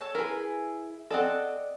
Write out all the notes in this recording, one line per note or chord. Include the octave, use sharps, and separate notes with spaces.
A4 C#5 A5
E4 G#4 A#4 B4
C4 G#4 A4 D5 D#5 F#5